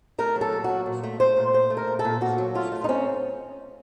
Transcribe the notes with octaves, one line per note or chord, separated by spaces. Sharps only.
A3 A#4
F#3
A4
A#2
F#3 F#4
A#2
A3
A3 C5
A#2
A#2 C5
A3
A#4
A#2
A4
A#2
A#2 F#4
F#3
A3 F4
A3
D#4
C4 C#4